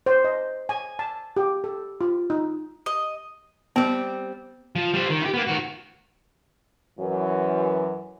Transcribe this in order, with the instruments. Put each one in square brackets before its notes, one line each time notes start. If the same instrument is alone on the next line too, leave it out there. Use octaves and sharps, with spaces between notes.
[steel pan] C5
D#5
G#5
A5
G4
A4
F4
D#4
[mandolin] D#5
[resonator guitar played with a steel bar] G3 C4 [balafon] B3
[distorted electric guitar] F3
G3 C5
D#3
E4 G4
A#3 B3
D#3 F#4
[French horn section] F#2 E3 F#3